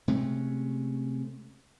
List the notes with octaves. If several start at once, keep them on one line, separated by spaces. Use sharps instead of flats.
C3 G#3 A3 C#4